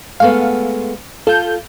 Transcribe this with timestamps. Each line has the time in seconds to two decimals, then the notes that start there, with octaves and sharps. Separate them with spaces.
0.20 G#3 A3 B3 F5
1.27 F4 A4 G6